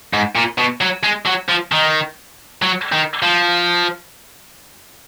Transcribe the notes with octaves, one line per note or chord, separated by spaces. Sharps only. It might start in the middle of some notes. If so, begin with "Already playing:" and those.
G#2
A#2
B2
F#3
G#3
F#3
F3
D#3
F#3
D#3
F3